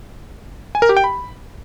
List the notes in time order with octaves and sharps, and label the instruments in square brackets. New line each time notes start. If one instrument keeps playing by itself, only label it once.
[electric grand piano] G#5
A#4
G4
G5
B5